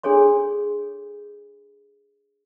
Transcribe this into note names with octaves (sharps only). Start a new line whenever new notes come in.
D4 G#4 A4 C#5 C6